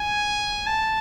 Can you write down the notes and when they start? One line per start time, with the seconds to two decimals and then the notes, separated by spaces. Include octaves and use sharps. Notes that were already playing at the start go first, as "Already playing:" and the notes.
Already playing: G#5
0.67 A5